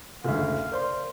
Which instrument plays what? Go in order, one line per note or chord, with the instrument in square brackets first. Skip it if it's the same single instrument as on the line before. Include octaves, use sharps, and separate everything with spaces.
[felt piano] F#1 D2 [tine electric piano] A4 E5 [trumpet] F5
[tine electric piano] A#4 C5 C6 [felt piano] D5